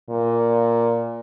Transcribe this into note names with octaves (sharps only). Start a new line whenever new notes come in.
A#2